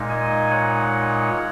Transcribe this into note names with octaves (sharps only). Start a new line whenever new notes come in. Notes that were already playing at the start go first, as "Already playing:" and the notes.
Already playing: A#2 G#3 D#4
D#5 G#5
C#5 F#5